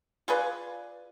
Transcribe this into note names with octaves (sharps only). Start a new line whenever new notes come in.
F4 G#4 B4 D5